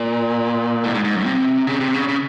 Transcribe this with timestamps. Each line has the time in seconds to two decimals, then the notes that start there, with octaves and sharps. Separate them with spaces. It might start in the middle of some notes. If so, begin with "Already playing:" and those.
Already playing: A#2
0.84 A2
0.94 G#2
1.04 G#2
1.16 F#2
1.26 C3
1.67 C#3
1.80 C3
1.94 C#3
2.08 C#3